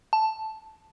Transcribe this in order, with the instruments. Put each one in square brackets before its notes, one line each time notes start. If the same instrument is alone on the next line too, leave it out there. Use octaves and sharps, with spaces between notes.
[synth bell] A5